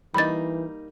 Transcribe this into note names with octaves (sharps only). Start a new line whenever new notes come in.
E3 G3 A#3 D#4 B5 A6